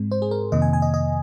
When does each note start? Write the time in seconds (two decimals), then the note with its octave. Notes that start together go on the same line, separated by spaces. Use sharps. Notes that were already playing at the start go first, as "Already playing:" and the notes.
Already playing: G#2 G#3 C4
0.11 C5
0.22 G#4
0.31 A#4
0.52 F2 C3 D#3 A#3 D#5
0.62 G#5
0.73 G#5
0.82 D#5
0.94 D#5